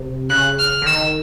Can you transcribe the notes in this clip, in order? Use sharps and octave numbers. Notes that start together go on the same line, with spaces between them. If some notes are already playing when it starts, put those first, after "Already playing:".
Already playing: C3
C#3 F#6
F6
D3
D#3 E6